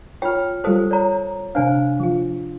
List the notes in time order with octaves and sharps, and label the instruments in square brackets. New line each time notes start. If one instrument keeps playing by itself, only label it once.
[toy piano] F4 G5 [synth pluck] C#5 F6
[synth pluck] G3 F4 A4 [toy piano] C5 D#6
[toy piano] C#5 A#5
[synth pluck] C3 F5 [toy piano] D4 C5 G#5
[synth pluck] F3 F4